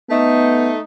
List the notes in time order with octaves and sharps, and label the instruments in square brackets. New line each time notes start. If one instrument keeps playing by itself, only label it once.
[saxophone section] A3 D#4 [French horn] B3